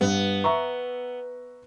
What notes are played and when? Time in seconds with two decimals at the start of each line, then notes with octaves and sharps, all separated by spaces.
0.01 G2 B3
0.44 E5 A#5 C#6